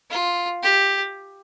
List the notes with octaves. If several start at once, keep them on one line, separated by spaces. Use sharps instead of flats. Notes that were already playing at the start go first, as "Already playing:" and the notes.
F4
G4